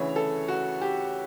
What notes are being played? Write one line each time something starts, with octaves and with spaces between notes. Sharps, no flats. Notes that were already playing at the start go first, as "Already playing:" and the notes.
Already playing: D2 C#3 E3 C#5
A4
F#4
G4